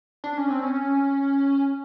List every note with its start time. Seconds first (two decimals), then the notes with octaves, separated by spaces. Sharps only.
0.24 D4
0.37 C#4
0.50 C4
0.63 C#4